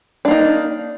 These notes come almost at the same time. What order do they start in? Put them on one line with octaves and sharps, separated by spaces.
D4 A#3 D#4